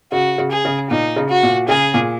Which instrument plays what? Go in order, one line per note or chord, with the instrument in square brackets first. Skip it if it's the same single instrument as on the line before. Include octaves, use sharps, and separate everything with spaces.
[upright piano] C#3 [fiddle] F#4
[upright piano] C#3
[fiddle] G#4
[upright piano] C#3
[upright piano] A#2 [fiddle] D#4
[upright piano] C#3
[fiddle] F#4
[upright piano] A#2
[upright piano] C#3 [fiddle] G#4
[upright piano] A#2